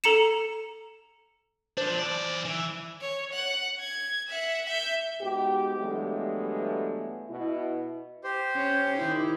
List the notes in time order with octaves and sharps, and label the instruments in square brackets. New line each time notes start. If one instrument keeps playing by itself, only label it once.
[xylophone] A4 A#5 C#7 E7
[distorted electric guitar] F3 D4 [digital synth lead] C5
[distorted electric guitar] E3 D5
E3
[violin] C#5
F#5
G#6
E5 F#5
E5 G6
[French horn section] G#2 G#3 B3 F#4 G4
G2 E3 F#3 G#3 A3 B3
B2 E4
[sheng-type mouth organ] G4 C5
[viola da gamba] C#4
D#3 E4